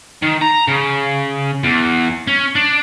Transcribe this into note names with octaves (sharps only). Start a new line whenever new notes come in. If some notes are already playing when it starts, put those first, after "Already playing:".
D#3
A#5
C#3
E2
C#4
D4